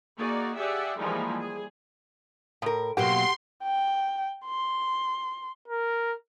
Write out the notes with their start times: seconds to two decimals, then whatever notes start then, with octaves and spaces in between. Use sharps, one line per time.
0.17 A#3 D#4 F#4 G#4 D5
0.56 G4 G#4 D5 E5 F#5
0.98 E3 F3 G3 G#3 A#3 D#4
1.38 G#4
2.62 A2 A#4
2.97 B2 F#3 A#3 G4 F#5 C6
3.63 G5
4.46 C6
5.68 A#4